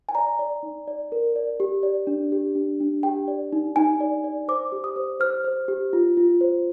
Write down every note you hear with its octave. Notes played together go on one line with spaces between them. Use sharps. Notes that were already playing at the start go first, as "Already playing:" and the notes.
G#5
D5 A#5
D5
D#4
D5
A#4
D5
G4
D5
D4
G4
D4
D4
G4 G5
D5
D#4
D#4 G#5
D5
D5
C5 D6
G4
D#6
C5
C5 F6
C5
G4
F4
F4
C5